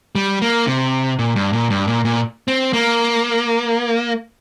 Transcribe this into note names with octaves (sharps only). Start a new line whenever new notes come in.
G3
A#3
C3
A#2
G2
A#2
G2
A#2
A#2
C4
A#3